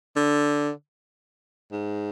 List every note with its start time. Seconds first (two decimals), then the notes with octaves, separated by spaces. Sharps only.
0.16 D3
1.72 G#2